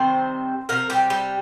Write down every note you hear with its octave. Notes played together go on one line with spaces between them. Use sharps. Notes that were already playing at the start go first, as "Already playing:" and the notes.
Already playing: C3 D#3 G3 C4 C5
C3 F3 A#3 A#4
G3 G4
G3 G4